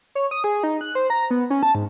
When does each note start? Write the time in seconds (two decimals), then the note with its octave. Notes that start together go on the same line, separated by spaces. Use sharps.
0.15 C#5
0.31 D#6
0.44 G#4
0.63 D#4
0.81 F#6
0.95 C5
1.10 A#5
1.31 B3
1.50 C#4
1.63 A5
1.75 G#2